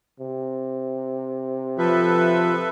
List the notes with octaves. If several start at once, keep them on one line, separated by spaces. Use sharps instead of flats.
C3
F3 A4 B4 E5